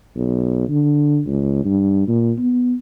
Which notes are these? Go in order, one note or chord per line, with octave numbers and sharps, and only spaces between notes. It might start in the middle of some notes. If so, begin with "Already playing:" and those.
B1
D3
C#2
G2
A#2
B3